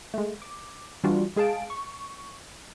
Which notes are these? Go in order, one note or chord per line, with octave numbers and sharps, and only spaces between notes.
G#3 A3
D6
E3 G3 D4 F4 F#4
G#3 G#4 F5 A5 D7
C#6